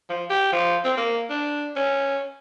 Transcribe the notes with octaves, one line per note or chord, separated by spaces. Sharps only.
F3
G4
F3
C4
A#3
D4
C#4